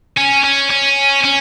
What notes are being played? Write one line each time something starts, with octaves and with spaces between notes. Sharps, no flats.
C#4
C#4
C#4
C#4